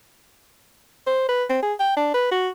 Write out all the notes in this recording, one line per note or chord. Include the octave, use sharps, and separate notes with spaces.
C5
B4
C4
G#4
G5
D4
B4
F#4